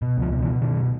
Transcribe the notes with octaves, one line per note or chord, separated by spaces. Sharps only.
B2
C#2 F3
B2
E3
B2
B2 D#3